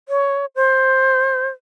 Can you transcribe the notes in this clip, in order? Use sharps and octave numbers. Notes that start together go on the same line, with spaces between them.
C#5
C5